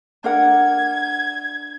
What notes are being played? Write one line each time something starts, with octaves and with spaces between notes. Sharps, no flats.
D4 A#4 F#5 G#6